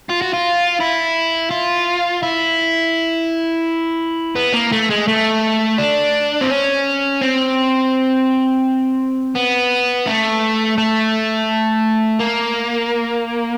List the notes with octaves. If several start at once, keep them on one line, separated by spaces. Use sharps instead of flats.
F4
F#4
F4
E4
F4
E4
B3
A#3
A3
G#3
A3
D4
C4
C#4
C4
B3
A3
A3
A#3